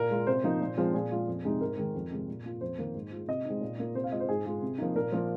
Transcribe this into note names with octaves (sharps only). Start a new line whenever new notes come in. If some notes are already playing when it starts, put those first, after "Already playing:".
Already playing: A#2 A#4
G#3 F4
C3 C5
F3 A#3 D#4
A#2
F3 G#3 C4 F4
A#2 G#4
G#3 F4
F2
C3 G#3 D#4
G#2 A#4
D#3 G#3
F2
C3 G#3
A#2
A#3 F4
F2 C5
D#3 A#3
G#2
G#3 F4
C3 D#5
G#3 C4 D#4
A#2
A#3 F4
C3 C5
F5
G#3 F4 D#5
C5
G#2 G#4
G#3 F4
C3
F3 A#3 D#4
A#2 A#4
F3 A#3 F4